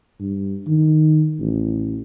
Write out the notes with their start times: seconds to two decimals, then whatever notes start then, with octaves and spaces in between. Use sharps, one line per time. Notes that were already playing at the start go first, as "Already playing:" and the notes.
0.21 G2
0.67 D#3
1.39 A1